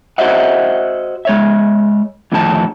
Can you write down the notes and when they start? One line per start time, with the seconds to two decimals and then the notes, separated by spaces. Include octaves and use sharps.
0.18 F#4 C5 D#5 E5 F#5
1.25 G#3 C#5 E5
2.32 F2 A2 D3 D#3 G#5 A5